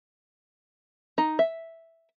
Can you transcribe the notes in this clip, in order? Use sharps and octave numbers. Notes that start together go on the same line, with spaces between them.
D#4
E5